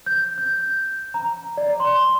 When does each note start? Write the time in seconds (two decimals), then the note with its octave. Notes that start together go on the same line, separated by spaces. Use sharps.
0.06 G6
0.38 G6
1.14 A#5
1.57 D5
1.80 C6